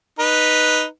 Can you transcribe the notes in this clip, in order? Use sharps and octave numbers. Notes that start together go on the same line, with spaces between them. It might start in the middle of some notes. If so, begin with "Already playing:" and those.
D#4 B4